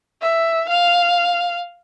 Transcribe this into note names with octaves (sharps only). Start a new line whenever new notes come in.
E5
F5